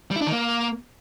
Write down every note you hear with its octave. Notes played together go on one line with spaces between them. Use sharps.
G3
E4
D4
D#3
A#3